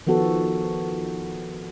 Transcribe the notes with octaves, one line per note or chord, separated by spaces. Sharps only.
D#3 F3 B3 F#4 A4